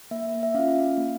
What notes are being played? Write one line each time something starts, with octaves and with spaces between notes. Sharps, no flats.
A#3 E5
E5
C#4 F4 F5
A#3